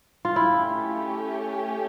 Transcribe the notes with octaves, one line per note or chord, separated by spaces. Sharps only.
F4
A3 C#4 E4 G4